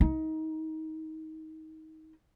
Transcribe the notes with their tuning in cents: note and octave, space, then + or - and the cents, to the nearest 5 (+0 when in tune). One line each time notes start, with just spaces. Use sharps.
D#4 +25